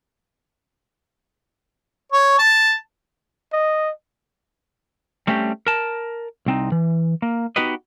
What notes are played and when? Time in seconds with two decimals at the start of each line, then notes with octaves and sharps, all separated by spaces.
2.12 C#5
2.38 A5
3.53 D#5
5.27 G3 A3 C4 C#4 G4
5.67 A#4 A5
6.46 C2 C4 D#4
6.72 E3
7.22 A#3
7.56 B3 D#4 F#4 G4 B4 D#5